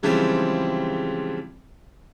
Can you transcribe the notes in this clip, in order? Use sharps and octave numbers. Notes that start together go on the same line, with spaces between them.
C#3 E3 F3 G3 G#3 C4